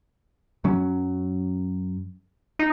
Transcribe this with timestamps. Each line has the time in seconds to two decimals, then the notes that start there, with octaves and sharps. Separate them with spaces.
0.64 F#2 F#3 C#4
2.59 D#4